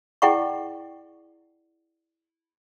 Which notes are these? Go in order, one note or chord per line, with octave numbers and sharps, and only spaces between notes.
E4 G#4 D5 F#5 G5 C#6